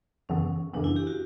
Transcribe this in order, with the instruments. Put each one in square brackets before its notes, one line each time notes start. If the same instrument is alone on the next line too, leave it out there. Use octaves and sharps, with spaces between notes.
[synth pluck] F#2 C#3 E3 B3 [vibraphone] C#4
[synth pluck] F#2 C#3 E3 B3 [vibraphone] D4
[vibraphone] E4
G4
F#4